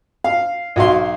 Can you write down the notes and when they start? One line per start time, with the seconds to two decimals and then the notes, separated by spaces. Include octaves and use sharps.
0.24 F5
0.76 B1 F#4 F5 C6